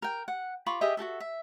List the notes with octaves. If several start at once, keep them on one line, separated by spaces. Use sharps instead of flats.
A#4 G5
F#5
F4 B5 C#6 D6
G4 G#4 D#5 E5
F#4 G4 A4 E5
E5